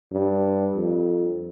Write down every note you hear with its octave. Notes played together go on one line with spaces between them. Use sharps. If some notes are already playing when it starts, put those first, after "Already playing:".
G2
F2